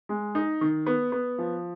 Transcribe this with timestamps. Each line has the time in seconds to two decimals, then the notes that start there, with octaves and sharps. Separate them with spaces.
0.09 G#3
0.35 D#4
0.61 D#3
0.87 B3
1.12 B3
1.38 F3